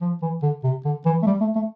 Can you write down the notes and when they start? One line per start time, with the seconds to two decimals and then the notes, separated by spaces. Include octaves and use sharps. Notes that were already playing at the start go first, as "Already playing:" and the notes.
0.01 F3
0.22 E3
0.42 D3
0.64 C3
0.85 D3
1.05 E3
1.23 A3
1.26 G3
1.40 A3
1.55 A3